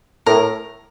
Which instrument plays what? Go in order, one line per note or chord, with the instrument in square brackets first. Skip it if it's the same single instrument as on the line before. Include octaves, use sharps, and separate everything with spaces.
[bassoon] A2 [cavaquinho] A#4